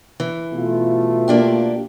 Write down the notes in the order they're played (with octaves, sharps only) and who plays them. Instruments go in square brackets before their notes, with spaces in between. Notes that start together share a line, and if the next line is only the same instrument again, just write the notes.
[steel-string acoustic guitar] E3
[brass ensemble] B2 A3 F4
[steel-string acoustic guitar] A#3 D4 G4